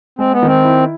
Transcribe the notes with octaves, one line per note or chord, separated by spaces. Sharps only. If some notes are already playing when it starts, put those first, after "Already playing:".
G#3 C4
B3
D#3 C4
E4